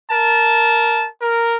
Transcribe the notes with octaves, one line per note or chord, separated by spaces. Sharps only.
A#4 A5
A#4